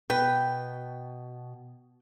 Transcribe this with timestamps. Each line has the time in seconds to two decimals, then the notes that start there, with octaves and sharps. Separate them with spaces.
0.10 B2 B4 G5